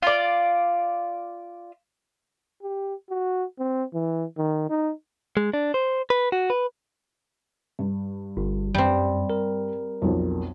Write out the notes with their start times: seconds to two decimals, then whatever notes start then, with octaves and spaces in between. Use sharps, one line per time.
0.02 F4 D5
2.63 G4
3.10 F#4
3.59 C4
3.94 E3
4.38 D#3
4.70 D#4
5.37 G#3
5.54 D4
5.74 C5
6.10 B4
6.32 F#4
6.50 B4
7.79 G2
8.37 G1
8.74 F#2 G3 C4
9.30 A#4
10.02 B1 F2